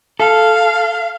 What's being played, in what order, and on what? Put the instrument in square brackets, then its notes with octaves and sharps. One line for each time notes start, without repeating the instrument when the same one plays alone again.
[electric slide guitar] A4 [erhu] F5